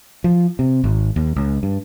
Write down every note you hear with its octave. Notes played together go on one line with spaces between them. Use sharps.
F3
C3
G#1
D#2
C#2
G2